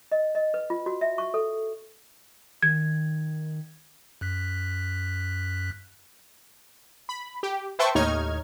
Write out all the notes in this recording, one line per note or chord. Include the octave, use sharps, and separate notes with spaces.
D#5
D#5
B4
F4
F#4
E5
C#6
A4
D#3 G#6
F#2 F#6 B6
B5
G4
B4 C5 E5 G5 A5 C#6
D#2 A2 D#4 C#5 F6 G#6